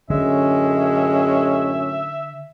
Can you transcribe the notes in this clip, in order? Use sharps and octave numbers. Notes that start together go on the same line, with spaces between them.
F#2 A2 D3 G#3 C#4 E5